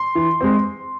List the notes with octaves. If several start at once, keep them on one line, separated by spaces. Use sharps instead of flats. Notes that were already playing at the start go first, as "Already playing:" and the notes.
Already playing: C6
E3
G#3 C4